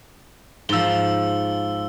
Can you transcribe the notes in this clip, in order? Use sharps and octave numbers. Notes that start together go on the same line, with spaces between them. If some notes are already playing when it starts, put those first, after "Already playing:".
G#2 F3 E6 G7